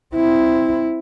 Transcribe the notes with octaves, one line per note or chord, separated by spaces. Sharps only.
C4 E4